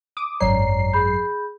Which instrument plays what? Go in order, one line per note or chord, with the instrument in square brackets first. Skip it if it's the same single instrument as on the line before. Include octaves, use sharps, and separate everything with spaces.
[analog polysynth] D6 D#6
[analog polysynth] G#1 F#2 C7 [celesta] C#5 D5 A#5
[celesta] G#4 B5 G6